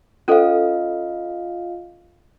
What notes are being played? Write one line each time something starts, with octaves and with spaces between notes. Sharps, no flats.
C#4 F4 A4 C5 D#5 F5